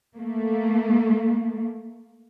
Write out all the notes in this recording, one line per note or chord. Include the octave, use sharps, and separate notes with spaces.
A3 A#3